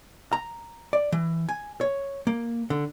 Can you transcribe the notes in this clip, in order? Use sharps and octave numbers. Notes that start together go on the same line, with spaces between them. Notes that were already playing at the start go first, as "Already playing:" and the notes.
A#5
D5
E3
G#5
C#5
A#3
D3